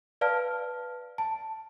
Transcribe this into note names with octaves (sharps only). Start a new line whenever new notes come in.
B4 D5 F5 A5 F6
A5